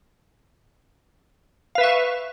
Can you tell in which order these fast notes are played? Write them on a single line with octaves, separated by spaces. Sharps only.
F5 B4 E5 C#6